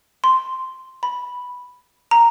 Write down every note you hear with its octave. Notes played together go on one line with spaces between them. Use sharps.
C6
B5
A#5